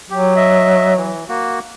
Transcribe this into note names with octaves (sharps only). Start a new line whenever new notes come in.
F#3 G4
D#5 E5
E3
A#3 F#4